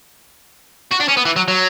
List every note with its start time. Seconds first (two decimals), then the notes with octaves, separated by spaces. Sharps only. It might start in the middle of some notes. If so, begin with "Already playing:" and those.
0.91 F#4
1.00 D4
1.08 C#4
1.17 B3
1.25 E3
1.36 F#3
1.48 F#3